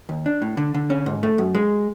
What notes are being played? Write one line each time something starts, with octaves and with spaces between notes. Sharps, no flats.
D#2
D4
A2
D3
D3
C#4
G#2
A3
F#2
G#3